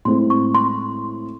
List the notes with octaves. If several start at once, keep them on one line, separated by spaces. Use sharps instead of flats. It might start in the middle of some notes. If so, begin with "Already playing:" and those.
A2 G#3 C4 E4 C6
C#6
C6